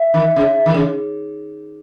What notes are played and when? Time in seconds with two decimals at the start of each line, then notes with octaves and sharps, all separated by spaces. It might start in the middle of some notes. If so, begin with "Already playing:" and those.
Already playing: E5
0.14 D#3
0.36 C#3
0.66 D#3
0.74 C#3